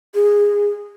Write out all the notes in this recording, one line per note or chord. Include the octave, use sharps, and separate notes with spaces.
G#4